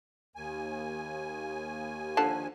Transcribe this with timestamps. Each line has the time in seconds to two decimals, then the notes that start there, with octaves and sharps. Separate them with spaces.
0.36 D#2 G#5
2.17 D3 F3 A5